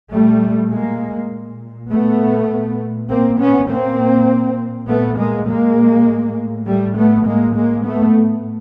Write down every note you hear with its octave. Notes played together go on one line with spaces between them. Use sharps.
A#2 G3 A3
G#3 A#3
A#2
A3 B3
A#2
A#3 C4
B3 C#4
A#2 A#3 C4
A#2 A3 B3
G#3 A#3
G#3 A#3
A2
G3 A3
A3 B3
A2 G#3 A#3
G#3 A#3
A3 B3